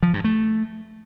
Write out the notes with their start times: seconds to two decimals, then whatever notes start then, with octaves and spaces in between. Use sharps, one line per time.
0.03 F3
0.13 G2
0.24 A3